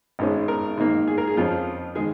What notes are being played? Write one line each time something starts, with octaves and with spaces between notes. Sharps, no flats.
G#1 G#2 G#3 C#4
A#4
G#2 D#3 A#3
G#4
A#4
G#4
F2 F3 C#4 F4
D#3 G#3 G#4